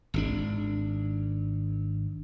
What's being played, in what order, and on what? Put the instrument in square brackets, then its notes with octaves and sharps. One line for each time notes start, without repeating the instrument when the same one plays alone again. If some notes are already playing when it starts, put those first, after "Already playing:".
[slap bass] G#1 C3 D4